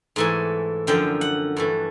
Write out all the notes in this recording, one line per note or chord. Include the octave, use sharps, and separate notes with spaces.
G#2 E3 A3 G#5
F#2 D3 F3 G5
F#5
G2 E3 A3